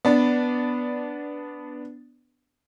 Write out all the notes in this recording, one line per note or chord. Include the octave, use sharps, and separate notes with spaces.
B3 D4